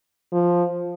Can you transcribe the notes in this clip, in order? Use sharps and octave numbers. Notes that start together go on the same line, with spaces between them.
F3